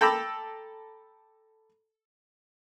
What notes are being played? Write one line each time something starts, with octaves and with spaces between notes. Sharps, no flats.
A4 G5 A#5 B5 D6 E6